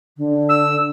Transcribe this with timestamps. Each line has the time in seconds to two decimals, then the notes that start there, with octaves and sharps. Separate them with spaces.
0.17 D3
0.49 E6